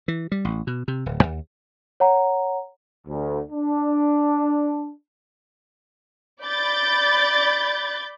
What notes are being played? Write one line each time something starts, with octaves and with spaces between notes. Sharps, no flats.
E3
G3
A1
B2
C3
D1
D#2
C#5 F#5 A#5
D2
D4
D5 B5 G6 A6